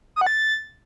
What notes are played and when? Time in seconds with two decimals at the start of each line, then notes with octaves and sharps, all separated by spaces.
0.16 D#6
0.21 F#5
0.27 A6